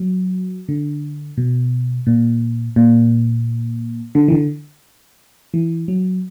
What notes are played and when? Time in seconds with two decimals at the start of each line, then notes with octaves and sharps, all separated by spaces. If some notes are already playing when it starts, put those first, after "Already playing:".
Already playing: F#3
0.69 D3
1.37 B2
2.07 A#2
2.76 A#2
4.15 D3
4.28 E3
4.32 D3
5.54 E3
5.88 F#3